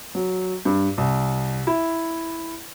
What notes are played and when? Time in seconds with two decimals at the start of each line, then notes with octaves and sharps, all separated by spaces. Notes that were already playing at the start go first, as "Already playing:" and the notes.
0.15 F#3
0.65 G2
0.98 C2
1.67 E4